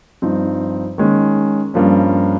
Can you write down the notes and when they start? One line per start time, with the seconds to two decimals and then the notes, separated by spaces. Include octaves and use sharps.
0.22 G2 F3 C4 D#4
0.98 D#3 G#3 C#4
1.74 G2 F3 A#3 C#4